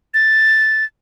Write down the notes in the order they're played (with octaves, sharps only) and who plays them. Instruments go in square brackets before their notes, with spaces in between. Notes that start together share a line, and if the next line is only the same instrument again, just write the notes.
[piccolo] A6